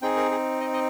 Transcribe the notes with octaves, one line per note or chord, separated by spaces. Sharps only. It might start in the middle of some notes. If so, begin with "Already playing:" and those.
C4 D#4 G#4 G5
A#4
G#4
D#5
D#5